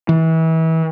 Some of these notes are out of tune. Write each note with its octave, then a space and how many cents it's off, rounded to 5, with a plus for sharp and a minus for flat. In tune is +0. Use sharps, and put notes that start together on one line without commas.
E3 -30